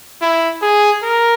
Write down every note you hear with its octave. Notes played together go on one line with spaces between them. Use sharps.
E4
G#4
A#4